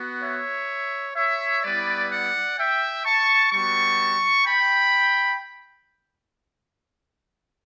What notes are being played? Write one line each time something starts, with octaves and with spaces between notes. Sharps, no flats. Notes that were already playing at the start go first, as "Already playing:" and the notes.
Already playing: B3 F#4
C#5 E5
C#5 E5
G3 B3 E4 B4 D5
D5 F#5
E5 G5
A5 C#6
G3 B3 F#4 A5 C#6
G5 B5